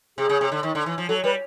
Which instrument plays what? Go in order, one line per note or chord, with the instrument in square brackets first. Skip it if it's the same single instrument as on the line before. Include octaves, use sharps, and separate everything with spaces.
[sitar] C3 [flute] G#4
[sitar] C#3
C3
D3
D#3
D3
E3
F3
[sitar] F#3 [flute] A4
[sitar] G3 [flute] B4